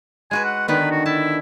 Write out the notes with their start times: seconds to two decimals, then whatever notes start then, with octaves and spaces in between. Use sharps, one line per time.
0.31 G#3 F#4 B4 G#5
0.45 F#5
0.68 D3 D#3 B3 B4
0.92 F#4
1.06 E4 A5